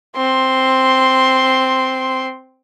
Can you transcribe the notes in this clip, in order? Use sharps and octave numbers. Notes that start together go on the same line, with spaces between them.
C4 C6